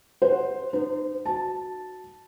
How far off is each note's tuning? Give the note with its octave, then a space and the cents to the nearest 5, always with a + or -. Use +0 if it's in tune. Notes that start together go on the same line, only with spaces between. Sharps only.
C5 +0 F#5 +0
D#4 -30 C5 -30
F#4 +0 A5 -5